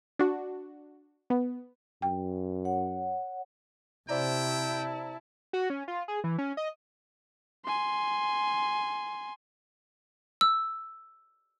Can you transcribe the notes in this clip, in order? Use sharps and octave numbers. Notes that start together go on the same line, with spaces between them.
D4 F#4
B3
F#2 G5
C#5 F#5
C3 E4 C5 D5 G5 A5 A#5
F#4
C#4
F4
G#4
E3
C#4
D#5
G#5 C6
E6